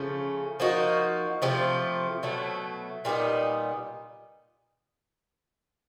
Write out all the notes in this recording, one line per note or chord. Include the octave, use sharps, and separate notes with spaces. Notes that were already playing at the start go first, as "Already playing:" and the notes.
Already playing: C#3 F3 A3 C#4
F3 A#3 D#4 F#4
C3 F3 A3
B2 F#3 A3
A#2 G3 B3 D#4